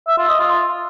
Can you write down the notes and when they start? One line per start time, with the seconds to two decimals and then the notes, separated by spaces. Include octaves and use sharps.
0.08 E5
0.19 F4
0.29 D#5
0.40 F4